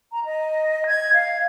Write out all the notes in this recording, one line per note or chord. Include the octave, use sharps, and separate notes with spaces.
A#5
D#5
G#6
F5